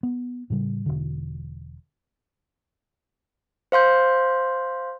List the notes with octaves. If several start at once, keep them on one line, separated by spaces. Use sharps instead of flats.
B3
A2 C#3 G3
E1 D3
C5 F5 C6 G6